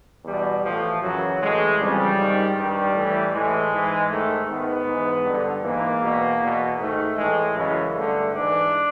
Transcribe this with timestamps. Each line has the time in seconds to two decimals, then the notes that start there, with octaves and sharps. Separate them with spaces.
0.24 E2 B2 G3
0.63 A2 E3 F3
1.01 F#2 C#3 E3 F#3
1.40 A2 E3 G#3
1.78 F2 C#3 E3 G3
2.17 G#2 D#3
2.55 G2 D#3 G3
2.94 A2 E3
3.32 A2 E3 G#3
3.71 G#2 E3
4.09 G#2 D#3 A3
4.48 G#2 D#3 B3
4.86 G#2 E3
5.24 G2 D3
5.63 G#2 E3 A#3
6.02 E2 B2
6.40 E2 B2
6.78 G#2 D#3 A3
7.16 A2 E3 G#3
7.55 F#2 C#3 E3 G#3
7.93 G2 D3 A3
8.32 G#2 E3 D4